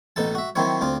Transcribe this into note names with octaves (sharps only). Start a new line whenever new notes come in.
A1 B2 D#4 A4 A5
F#4 E5
D#3 F#3 C4 E4 C#5
D2 C4 F4